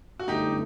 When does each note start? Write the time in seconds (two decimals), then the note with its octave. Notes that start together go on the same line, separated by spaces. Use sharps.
0.20 F#4
0.28 G1 F#2 D3 A3 D#4 G4